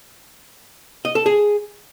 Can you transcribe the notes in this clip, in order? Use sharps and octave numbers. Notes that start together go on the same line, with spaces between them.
D#5
A4
G#4